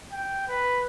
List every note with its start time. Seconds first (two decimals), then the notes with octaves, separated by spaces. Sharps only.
0.12 G5
0.48 B4